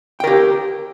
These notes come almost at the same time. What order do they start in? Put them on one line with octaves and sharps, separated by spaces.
G5 A#4 G4